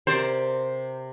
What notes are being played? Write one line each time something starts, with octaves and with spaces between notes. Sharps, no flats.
C3 A#4 C5 D5